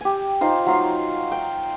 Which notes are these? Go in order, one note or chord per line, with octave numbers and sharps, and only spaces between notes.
G4 G#5
D#4 F4 C5
F#3 F4 F5
G5